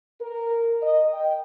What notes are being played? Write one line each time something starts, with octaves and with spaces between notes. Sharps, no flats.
A#4
D#5
G5